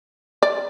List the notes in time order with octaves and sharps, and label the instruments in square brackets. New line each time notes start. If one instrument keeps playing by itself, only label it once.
[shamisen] D5